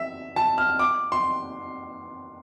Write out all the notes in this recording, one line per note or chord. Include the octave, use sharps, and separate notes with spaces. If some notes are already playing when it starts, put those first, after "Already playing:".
Already playing: E5
A5
F6
D6
C6